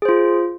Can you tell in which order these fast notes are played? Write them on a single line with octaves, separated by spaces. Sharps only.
G#4 C5 F4